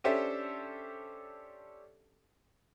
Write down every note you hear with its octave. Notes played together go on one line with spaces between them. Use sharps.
C#4 D4 G4 A4 C5 E5